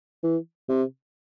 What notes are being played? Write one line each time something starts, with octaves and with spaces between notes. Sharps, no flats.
E3
C3